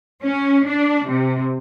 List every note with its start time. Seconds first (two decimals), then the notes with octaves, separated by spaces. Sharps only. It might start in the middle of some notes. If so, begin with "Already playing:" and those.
0.23 C#4
0.68 D4
1.07 C3